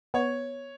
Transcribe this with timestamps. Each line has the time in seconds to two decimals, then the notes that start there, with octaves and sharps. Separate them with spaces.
0.14 B3 C#5